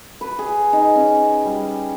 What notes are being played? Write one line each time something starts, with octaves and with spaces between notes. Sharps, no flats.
B4
G#4
D#4
C#4
G3